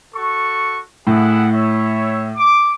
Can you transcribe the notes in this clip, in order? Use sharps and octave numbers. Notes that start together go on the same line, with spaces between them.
F#4 A4 C#6
A2 E4 G#4 F#5
C#5 E5
D6